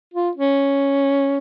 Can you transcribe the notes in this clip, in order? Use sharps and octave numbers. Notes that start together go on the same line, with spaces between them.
F4
C#4